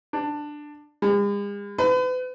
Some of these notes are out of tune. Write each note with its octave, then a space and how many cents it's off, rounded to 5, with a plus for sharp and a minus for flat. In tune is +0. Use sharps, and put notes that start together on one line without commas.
D4 +10
G#3 -45
B4 +40